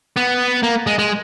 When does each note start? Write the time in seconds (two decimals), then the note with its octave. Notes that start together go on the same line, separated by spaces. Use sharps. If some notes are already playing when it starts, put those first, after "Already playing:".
0.16 B3
0.63 A#3
0.87 G#3
0.99 G#3